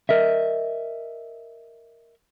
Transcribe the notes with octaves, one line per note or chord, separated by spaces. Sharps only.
A#4 D#5 E5